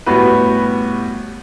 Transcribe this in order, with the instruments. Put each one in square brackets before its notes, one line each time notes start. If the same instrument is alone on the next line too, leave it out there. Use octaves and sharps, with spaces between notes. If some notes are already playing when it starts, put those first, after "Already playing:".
[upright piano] A2 G3 B3 F#4 B4